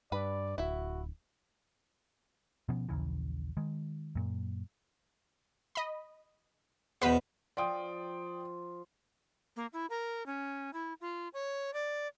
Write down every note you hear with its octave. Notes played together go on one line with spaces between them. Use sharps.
G2 B4 D5 B5
D1 E4 F#4 E5
B2 F3 B3 C#4
A#1 D#2 C#3 E3
D#3 G#3
F#2 A#2
D#5 B5
E2 B2 B4 C5 B5
F3 D5 G5 D#6
A#3
E4
A#4
C#4
E4
F4
C#5
D5